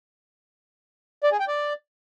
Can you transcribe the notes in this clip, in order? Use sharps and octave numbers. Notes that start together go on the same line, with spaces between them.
D5
G#4
G5
D5